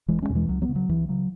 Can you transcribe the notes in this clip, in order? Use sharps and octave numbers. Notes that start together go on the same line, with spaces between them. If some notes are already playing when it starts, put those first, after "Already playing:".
E1 E3 G#3
G#3 C#4
E2 B2
E3 G#3
C#2 F#3
F#3 B3
C#3
F#3
C#2 E3
C#3 F#3